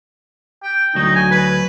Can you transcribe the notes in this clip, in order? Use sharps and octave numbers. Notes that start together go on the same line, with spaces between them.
G5
D2 F#3 D#4
G#5
B4